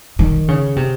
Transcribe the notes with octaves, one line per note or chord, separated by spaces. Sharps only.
D#3
C#3
C3